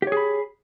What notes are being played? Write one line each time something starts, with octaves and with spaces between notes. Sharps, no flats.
G4 G#4 C#5 B5